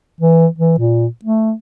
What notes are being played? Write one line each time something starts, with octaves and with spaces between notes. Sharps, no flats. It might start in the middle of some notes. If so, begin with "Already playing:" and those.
E3
E3
A#2
A3